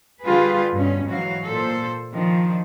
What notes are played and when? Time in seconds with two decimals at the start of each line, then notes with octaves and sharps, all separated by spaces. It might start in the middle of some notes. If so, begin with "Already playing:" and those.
0.25 D3 G3 F4 G4 G#4 B4
0.75 G2 B2 C#4
1.07 G#2 E3 F#3 F#4 F5
1.46 A#2 A4 C5
2.14 D#3 F3 D4